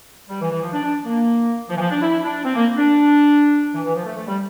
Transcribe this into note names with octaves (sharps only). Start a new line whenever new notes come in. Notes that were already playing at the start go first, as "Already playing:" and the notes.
G3
E3
E3
F3
D4
D4
A#3
F3
E3
F3
D4
E4
D4
C4
A#3
D4
E3
E3
F3
A3
A3
G3